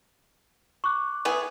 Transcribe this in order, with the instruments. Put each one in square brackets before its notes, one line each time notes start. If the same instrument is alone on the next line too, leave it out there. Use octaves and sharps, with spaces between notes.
[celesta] C#6 D6 F#6
[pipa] B3 E4 G#4